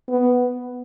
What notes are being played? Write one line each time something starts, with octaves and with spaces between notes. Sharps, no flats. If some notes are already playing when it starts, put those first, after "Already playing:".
B3